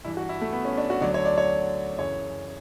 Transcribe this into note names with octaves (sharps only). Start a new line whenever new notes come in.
G2 E3 E4
F#4
E4
A3
B3
C#4
D4
F#4
D2 D3 F#3 D5
C#5
D5
C#5
F#2 C#3 E3 C#5